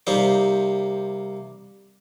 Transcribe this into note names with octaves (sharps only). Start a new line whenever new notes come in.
C3 G3 A#3 D#4 C5